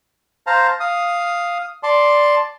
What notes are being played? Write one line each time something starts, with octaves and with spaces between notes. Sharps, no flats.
C5 F5 A5 A#5
F5 D#6
D5 A5 C6